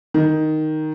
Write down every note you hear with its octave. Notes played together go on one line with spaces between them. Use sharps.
D#3